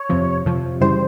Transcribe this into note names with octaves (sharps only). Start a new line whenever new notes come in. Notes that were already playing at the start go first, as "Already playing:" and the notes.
Already playing: C#5
F2 C3 F3
F2 C3 F3
F#2 C#3 E3 G3 C5